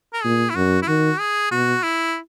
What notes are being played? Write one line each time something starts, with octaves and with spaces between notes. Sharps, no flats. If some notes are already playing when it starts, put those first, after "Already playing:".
A#4
A#2 G#4
E4
F#2 F#4
E4
D#3 F#4
G#4
B2 F#4
E4